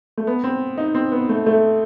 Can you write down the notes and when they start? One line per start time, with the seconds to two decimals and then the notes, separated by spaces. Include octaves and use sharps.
0.18 A3
0.27 B3
0.44 C4
0.78 D#4
0.95 C4
1.12 B3
1.29 A3
1.46 A3